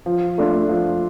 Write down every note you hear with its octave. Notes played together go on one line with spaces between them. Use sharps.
F3
A3 D4 F4
F3